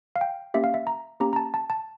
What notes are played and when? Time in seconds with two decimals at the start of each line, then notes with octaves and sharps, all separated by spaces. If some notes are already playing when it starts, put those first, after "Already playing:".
0.16 F5
0.21 G5
0.54 A#3 C#4 G4 E5
0.64 F5
0.74 E5
0.87 A#5
1.20 A#3 C#4 G4 A#5
1.33 A#5
1.36 A5
1.54 A5
1.70 A5